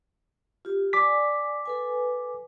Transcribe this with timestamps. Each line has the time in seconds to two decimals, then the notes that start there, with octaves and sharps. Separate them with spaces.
0.65 F4 G4
0.93 D5 G#5 D6 B6
1.65 A4 B4 G#5